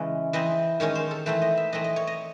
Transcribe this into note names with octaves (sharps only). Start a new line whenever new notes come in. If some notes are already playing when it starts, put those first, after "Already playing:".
Already playing: C#3 E3 G#3 C#4
E3 C4 D#5
D#3 G#3 C#4 C#5
C5
A4
E3 A3 C4 C5
D#5
E5
E3 A3 C4 D#5
D#5
C#5
D#5